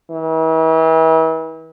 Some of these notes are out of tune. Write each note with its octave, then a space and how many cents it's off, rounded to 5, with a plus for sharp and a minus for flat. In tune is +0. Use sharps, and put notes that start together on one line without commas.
E3 -40